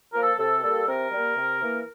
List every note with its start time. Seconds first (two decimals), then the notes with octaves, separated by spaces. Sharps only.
0.12 F3 A#3 A#4
0.21 A4
0.38 C3 A4
0.62 G3 A#3 A4
0.87 C3 A#4
1.12 G3 A#3
1.36 C3
1.62 E3 A#3